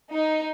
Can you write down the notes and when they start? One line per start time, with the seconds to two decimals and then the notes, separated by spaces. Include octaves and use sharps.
0.11 D#4